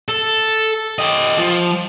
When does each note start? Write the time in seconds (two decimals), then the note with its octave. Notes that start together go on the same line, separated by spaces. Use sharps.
0.08 A4
0.98 G4 D#5
1.38 F3